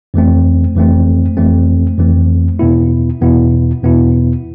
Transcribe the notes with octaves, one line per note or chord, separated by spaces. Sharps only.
F2 E3 A3 C4
F2 E3 A3 C4
F2 E3 A3 C4
F2 E3 A3 C4
E2 B2 B3 E4
E2 B2 B3 E4
E2 B2 B3 E4